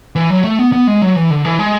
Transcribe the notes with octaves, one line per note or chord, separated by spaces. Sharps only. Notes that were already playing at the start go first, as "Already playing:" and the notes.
E3
F#3
A3
B3
B3
G#3
F#3
E3
D3
E3
G#3